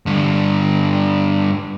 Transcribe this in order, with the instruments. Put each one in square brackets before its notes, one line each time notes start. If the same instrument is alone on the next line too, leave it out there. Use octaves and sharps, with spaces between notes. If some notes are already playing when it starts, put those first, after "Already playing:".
[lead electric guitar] G2 D3